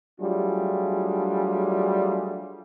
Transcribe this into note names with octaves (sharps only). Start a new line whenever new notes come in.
F#3 G3 A3 D4 F4 G#4